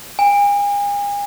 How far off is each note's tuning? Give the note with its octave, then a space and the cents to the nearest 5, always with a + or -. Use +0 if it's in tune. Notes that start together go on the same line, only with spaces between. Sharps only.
G#5 -40